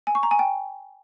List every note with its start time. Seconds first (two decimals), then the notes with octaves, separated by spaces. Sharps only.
0.07 G#5
0.15 C#6
0.23 A#5
0.31 G#5
0.39 G5